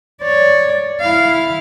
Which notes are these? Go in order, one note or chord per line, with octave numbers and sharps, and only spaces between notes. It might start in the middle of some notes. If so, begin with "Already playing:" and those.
C#5 D5
E4 F5